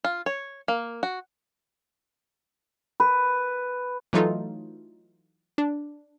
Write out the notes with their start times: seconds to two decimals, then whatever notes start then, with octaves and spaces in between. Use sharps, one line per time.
0.04 F4
0.26 C#5
0.68 A#3
1.03 F#4
3.00 B4
4.13 E3 F#3 A3 D#4 F4 A4
5.58 D4